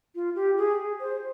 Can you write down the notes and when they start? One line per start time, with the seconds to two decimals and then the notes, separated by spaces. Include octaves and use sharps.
0.15 F4
0.36 G4
0.57 G#4
1.00 C5